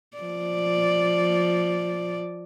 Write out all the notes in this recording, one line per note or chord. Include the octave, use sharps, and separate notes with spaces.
F3 D5